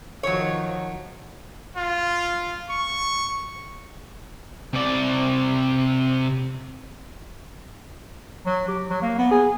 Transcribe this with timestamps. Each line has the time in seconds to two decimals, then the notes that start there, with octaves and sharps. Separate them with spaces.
0.23 D#3 F3 F#3 C#5
1.76 F4
2.70 C#6
4.73 C3 D5
8.46 F#3
8.68 G4
8.90 F#3
9.02 A#3
9.19 B3
9.31 G#4